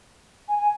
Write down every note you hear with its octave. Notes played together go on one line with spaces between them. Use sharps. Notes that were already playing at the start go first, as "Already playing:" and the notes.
G#5
G#5